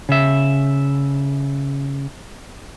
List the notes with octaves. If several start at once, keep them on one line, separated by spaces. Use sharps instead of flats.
C#3 E5